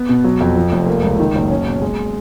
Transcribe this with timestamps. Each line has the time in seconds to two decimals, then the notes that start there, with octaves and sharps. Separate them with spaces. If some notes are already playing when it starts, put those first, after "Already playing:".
Already playing: B3
0.09 B2
0.24 F#3
0.40 F2
0.56 F3
0.72 F1
0.87 A#3
1.04 C#2
1.19 D#3
1.35 F#1
1.50 C#4
1.67 B2
1.82 G#3